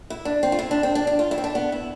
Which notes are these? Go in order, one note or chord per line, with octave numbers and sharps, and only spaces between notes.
E4
D4
C4
F4
E4
D4
C4
D4
D4
F4
E4
C4
D4
B3
E4